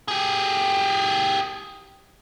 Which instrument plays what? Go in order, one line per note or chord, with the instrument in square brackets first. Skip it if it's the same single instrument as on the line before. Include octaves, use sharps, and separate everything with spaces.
[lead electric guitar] G4 G#4